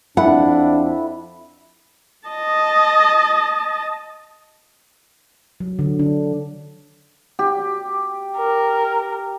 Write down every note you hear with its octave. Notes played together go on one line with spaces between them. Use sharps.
F2 D4 E4 F#5
D#5 A5
F#3
D3
D4
G4
A#4